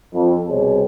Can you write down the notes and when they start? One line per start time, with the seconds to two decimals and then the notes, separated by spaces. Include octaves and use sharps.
0.14 F2
0.48 C2 B2 C4 G#4 C5 C#5